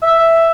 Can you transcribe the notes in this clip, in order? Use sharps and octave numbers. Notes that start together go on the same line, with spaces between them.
E5